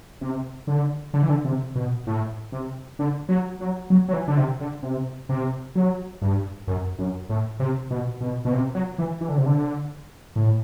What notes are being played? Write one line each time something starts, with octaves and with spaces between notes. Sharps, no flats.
C3
D3
D3
E3
D3
C3
B2
A2
C3
D3
F#3
F#3
F#3
F#3
E3
D3
C3
D3
C3
C3
F#3
G2
F#2
F#2
A2
C3
B2
B2
B2
C3
F#3
E3
E3
D3
C3
D3
A2